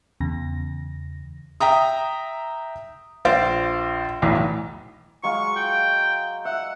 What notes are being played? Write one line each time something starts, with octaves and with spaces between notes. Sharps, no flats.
E2 C#3 A#6
E5 G5 A#5 D#6
A#1 C5 F5 A6 D7
B1 E2 A2
F#3 G#3 F5 C#6
G5
E5 F#5